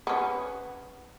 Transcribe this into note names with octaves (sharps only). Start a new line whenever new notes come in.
B3 C#4